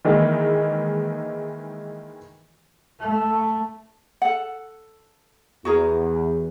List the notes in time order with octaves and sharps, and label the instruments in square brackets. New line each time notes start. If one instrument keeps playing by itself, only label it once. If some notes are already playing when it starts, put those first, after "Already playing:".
[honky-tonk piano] D#3 E3 G#3 A#3
[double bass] A3
[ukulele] A4 F#5
[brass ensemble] E2 [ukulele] F#4 G#4 A#4